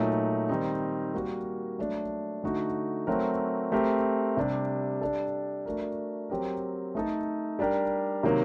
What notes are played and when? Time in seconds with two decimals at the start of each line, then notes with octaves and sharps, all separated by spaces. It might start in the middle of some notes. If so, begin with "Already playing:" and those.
Already playing: A#2 F#3 A3 D#4
0.49 D#3 G3 C4 D#4
1.14 G3 A#3 F#4 A#4
1.79 F#3 A3 D4 A4
2.43 D3 A3 D#4 F#4
3.07 F#3 A3 C4 F#4 A#4
3.72 A3 C4 G4 A#4
4.37 C3 G3 D4
5.01 G3 D4 A4
5.66 A3 D4 F#4 A#4
6.30 F#3 C4 G4 A#4
6.95 A3 D#4 A4
7.59 G3 D4 G4 A#4
8.23 C3 D#3 F#3 A#3